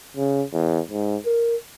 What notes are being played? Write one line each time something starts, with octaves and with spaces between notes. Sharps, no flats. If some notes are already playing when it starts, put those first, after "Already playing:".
C#3
E2
G#2
A#4